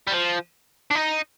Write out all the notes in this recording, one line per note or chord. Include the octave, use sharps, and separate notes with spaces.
G3
F3
D4
D#4